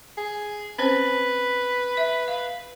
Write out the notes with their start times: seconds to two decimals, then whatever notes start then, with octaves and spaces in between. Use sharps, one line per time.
0.17 G#4
0.79 C4 C#4 B4 C5
1.97 E5
2.28 F5